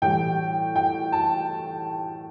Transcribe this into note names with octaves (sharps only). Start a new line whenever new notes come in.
A2 E3 G3 G5
G5
A5